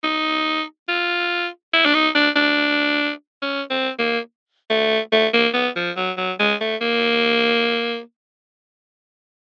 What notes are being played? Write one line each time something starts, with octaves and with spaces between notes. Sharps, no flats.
D#4
F4
E4
D4
D#4
D4
D4
C#4
C4
A#3
A3
A3
A#3
B3
F3
F#3
F#3
G#3
A3
A#3